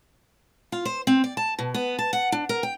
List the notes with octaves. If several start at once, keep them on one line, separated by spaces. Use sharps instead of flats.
F4
C5
C4
D5
A5
B2
B3
A5
F#5
D4
A#4
G5